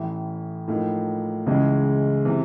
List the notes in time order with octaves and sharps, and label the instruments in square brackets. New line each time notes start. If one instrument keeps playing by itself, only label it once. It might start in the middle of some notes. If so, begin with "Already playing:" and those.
Already playing: [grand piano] A1 A2 E3
A2 F3 A#3 D#4
C#2 C#3 E3 G#3
C3 E3